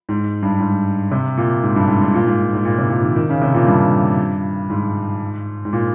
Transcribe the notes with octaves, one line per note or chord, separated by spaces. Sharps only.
G#2
G2
G#2
C3
A#2
G#2
G2
G#2
G#2
A#2
G#2
G#2
A#2
C3
A#2
D#3
D#3
C#3
C3
A#2
G2
G#2
G#2
A#2